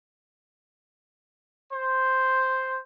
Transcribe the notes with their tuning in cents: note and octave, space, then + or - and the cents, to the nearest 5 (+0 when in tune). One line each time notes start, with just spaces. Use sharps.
C5 +0